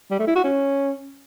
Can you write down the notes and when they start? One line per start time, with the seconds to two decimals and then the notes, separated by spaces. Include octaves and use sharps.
0.11 G3
0.19 A3
0.27 E4
0.36 F#4
0.44 C#4